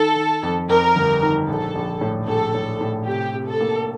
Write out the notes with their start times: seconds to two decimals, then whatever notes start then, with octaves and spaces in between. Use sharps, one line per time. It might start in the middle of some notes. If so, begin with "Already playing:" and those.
Already playing: D#3 A4
0.16 D#3
0.43 F2
0.69 F2 A#4
0.96 G1
1.22 D#3
1.48 A#1 A4
1.75 A#1
2.01 A2
2.27 A#1 A4
2.54 A2
2.81 A2
3.07 C3 G4
3.34 C3
3.47 A4
3.60 A#3